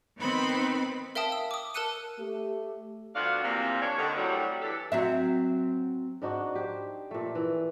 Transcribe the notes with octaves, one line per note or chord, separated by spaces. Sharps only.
D#3 B3 C4 D#4 C5 B5
A#4 E5 F5 G5 A5 D#6
E6
D6 D#6
A#4 A5 E6 F#6 C#7 D#7
A3 G4
D2 B3 D4 F4 F#4 F5
C3 E3 F3 G3 A#3 C4
D4 C#5
D3 D#3
A2 C3 F#3 G3
E3 D4 G4 A4
F#3 C4 E5
G#2 D4 D#4 F#4
G4 C5
A#2 A3
E3